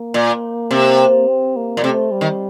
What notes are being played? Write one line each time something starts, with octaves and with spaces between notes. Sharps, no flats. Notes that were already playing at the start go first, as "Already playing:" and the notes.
Already playing: A#3
A#2
C3
C4
A#3
A#2
C3 A3
G3
D#3